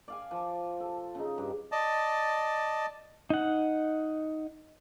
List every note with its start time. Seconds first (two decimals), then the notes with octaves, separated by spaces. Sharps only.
0.08 D5 F5 G#5
0.31 F3
0.80 A4
1.15 C#3 D#4
1.38 G2
1.72 D5 D#5 A5
3.30 D#4 F#5